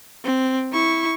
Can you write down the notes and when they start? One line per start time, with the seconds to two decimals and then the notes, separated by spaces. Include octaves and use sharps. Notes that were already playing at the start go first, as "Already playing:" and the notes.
0.24 C4
0.72 E4 C#6